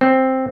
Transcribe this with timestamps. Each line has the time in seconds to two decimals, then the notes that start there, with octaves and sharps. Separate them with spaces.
0.01 C4